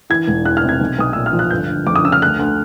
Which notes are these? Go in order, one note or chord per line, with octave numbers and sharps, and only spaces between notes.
E3 G#6
E1
E2 F#6
F6
C3
G#6
B1
B1 D#6
A#2 E6
F6
F3
F#6
G1 G6
G1
F2 D6
D#6
C#3 E6
F6
D2 F#6
D2